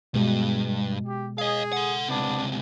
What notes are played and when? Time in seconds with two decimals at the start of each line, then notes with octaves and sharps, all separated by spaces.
0.14 G2 B2 G#3
1.05 G4
1.38 G#4 D#5 F5
1.73 A4 F#5
2.08 C#2 C3 B3 D4